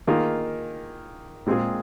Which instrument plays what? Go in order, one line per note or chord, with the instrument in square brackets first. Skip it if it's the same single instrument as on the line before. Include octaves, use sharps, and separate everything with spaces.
[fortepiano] D#3 A#3 F4 G#4
A#2 G#3 C4 F4 G#4